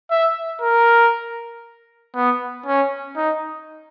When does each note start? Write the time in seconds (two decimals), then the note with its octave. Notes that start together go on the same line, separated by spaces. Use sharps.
0.11 E5
0.62 A#4
2.15 B3
2.66 C#4
3.16 D#4